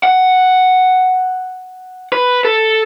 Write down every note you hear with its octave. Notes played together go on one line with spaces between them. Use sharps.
F#5
B4
A4